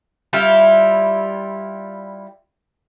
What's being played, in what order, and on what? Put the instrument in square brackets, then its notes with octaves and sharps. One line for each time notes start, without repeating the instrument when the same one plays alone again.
[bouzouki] G3 E4 F4